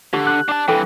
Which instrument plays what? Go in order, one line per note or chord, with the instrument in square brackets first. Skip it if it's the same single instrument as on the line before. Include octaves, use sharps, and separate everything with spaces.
[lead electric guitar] D3 [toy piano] G4
[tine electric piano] F#6
[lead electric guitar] D4 A5
[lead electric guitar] G2 E3 [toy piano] A4 G5